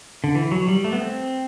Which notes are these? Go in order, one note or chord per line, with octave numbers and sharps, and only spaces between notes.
D3
E3
F#3
G3
A3
B3
C4